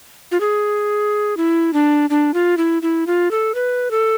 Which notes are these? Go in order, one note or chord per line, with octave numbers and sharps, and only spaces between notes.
F4
G#4
E4
D4
D4
F4
E4
E4
F4
A4
B4
A4